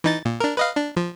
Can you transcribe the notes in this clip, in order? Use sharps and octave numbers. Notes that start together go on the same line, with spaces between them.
E3 D#4 A6
A#2
D4 A#4
B4 D#5 F5
D4
F3